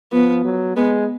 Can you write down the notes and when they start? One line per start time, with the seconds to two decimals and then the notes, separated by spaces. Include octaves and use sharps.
0.12 F3 B3
0.44 F#3
0.76 G#3 B3